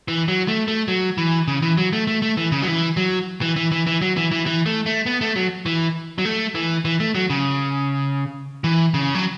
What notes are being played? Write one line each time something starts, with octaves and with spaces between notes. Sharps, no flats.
E3
F#3
A3
A3
F#3
E3
C#3
E3
F#3
A3
A3
A3
E3
C#3
F#3
E3
F#3
E3
E3
E3
E3
F#3
E3
E3
E3
A3
A3
B3
A3
F#3
E3
F#3
A3
E3
E3
A3
F#3
C#3
E3
C#3
F#3